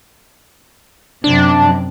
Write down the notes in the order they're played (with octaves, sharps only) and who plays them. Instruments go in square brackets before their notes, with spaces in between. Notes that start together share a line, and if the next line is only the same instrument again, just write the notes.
[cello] F#2 C3 [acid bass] D4